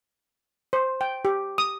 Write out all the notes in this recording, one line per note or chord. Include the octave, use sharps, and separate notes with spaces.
C5
G5
G4
D#6